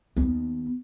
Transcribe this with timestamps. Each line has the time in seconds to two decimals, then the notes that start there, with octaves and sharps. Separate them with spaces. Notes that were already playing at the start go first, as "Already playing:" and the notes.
0.16 D#2 B3